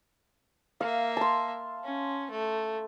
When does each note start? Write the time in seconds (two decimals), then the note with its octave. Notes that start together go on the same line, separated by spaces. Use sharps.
0.81 A#3 E5 F5
1.17 A5 C6
1.84 C#4
2.31 A3